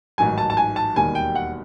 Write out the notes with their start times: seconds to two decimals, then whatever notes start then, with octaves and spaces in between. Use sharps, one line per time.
0.18 A1 G#2 D#3 F#3 G#5
0.38 A5
0.50 A5
0.57 G#5
0.76 A5
0.95 E1 D#2 D#3 G3 G#5
1.15 G5
1.35 F#5